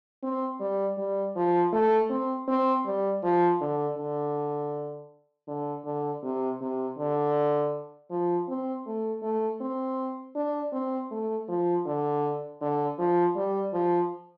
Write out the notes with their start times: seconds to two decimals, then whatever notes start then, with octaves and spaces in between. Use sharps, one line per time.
0.23 C4
0.60 G3
0.98 G3
1.36 F3
1.73 A3
2.10 C4
2.48 C4
2.86 G3
3.24 F3
3.61 D3
3.98 D3
5.48 D3
5.85 D3
6.24 C3
6.61 C3
6.99 D3
8.11 F3
8.48 C4
8.86 A3
9.23 A3
9.61 C4
10.35 D4
10.73 C4
11.11 A3
11.49 F3
11.86 D3
12.61 D3
12.99 F3
13.36 G3
13.74 F3